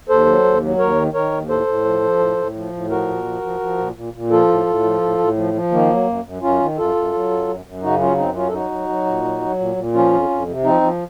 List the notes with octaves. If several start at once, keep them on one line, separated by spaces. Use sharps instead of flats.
D#2 A4 C5
F#3
D#2
F#3
D#2 A#4 C#5
D#3
D#3 A#4 C#5
D#2
A2 A4 C5
A2
F3
F3
A2
A2
F3
A2
F3 F#4 A#4
A#2
F3
F3
F3
A#2
A#2
A#2
F3 F4 A4
A2
A2
F3
A2
A2
F3
F3
D#3 A#3
F#3
F#2
F#2
F#2 C#4 F4
D#3
F#2 F4 A4
F#2
F#3
F#2
F#2
F#2
C#3 D#4 F#4
F#3 C#4 F4
F#2 C4 D#4
F#3 C#4 F4
A4
F#3 D#4 F#4
F#3
F#3
A#2
F#3
F#3
A#2
A#2
F3 C#4 F4
F2
F2
C3
F3 C4 D#4
F3